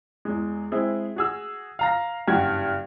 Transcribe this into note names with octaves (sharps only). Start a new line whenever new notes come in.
E2 G#3
G#3 C4 E4 G#4
F#4 G#4 E6
F5 A#5 A#6
F#1 G2 F#4 G5 G#6